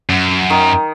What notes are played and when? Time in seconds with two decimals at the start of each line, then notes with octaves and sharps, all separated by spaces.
0.09 F#2
0.50 D#3